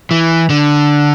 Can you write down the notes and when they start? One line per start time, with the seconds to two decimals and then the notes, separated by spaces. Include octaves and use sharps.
0.11 E3
0.50 D3